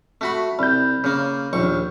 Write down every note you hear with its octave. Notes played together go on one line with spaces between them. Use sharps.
A3 F#4 B5
C2 B5 G6
C#3 A#3
A#1 D#2 C#6